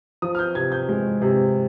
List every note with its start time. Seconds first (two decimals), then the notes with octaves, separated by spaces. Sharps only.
0.22 F3 D#6
0.35 F6
0.39 G6
0.55 C3 G#6
0.72 G6
0.89 G#3
1.22 C3